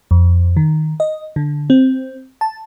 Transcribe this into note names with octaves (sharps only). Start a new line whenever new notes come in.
F2
D#3
D#5
D3
C4
A5